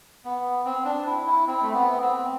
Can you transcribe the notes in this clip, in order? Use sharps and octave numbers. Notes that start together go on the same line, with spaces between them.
B3
C4
D4
E4
E4
C4
A3
B3
C4